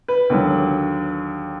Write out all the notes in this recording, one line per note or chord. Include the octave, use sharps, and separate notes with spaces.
B4
D#2 D3 F#3